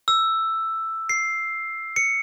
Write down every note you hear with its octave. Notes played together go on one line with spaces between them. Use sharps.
E6
C7
C#7